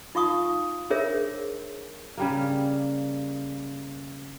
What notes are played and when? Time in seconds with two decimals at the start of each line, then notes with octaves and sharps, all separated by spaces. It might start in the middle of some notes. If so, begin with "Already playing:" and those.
0.15 D#4 F4 F5 C#6 D#6
0.90 D4 G#4 A#4 C5 C#5 E5
2.17 C#3 G3 A#3